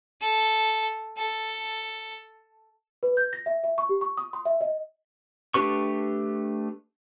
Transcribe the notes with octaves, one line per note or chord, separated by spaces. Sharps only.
A4
A4
B4
G6
A#6
E5
E5
C#6
G4
C#6
D#6
C6
E5
D#5
A3 D4 G4 B4 C#6